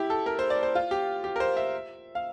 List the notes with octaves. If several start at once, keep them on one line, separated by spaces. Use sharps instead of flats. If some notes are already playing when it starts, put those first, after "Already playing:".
Already playing: E4 G4
A4
A#4
C5
D5
C5
F4
G4
G4
A#4
C5
E5
F5